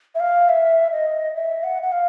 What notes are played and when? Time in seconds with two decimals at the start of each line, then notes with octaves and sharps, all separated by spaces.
0.15 E5
0.20 F5
0.49 E5
0.92 D#5
1.34 E5
1.63 F#5
1.82 F#5
1.92 F5